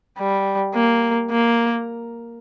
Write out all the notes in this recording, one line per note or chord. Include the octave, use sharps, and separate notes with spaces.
G3
A#3
A#3